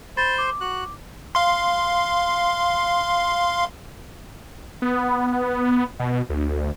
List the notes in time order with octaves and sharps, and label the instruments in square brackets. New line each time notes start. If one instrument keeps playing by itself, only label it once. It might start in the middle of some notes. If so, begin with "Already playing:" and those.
[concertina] C5 C6 [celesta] B5 A6
[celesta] D6
[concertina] F#4 F#6
[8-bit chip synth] F5 C6
[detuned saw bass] B3
B2
D2